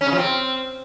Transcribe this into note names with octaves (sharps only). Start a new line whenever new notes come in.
C#4
C#3
F3
C4